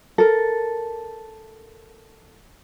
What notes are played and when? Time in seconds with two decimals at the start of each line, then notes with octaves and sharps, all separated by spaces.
0.18 A4 A#4